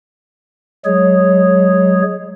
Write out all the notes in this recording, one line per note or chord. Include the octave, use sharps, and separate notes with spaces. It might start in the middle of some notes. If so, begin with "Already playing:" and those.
F#3 G#3 G#4 C#5